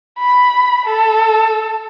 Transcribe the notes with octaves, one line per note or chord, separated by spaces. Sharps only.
B5
A4